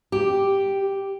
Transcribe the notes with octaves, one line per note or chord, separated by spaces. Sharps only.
G4